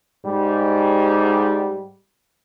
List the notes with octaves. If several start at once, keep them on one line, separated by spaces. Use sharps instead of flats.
G#2 G3